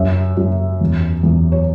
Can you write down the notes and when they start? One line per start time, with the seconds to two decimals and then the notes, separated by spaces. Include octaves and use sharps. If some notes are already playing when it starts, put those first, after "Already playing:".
Already playing: F#2 E5
0.37 F#2
0.81 E2
1.23 E2
1.52 C#5